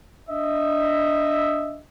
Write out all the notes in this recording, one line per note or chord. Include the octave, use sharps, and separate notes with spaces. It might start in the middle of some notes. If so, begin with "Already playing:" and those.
D4 D#5 E5